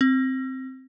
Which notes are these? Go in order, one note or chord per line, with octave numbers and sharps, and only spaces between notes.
C4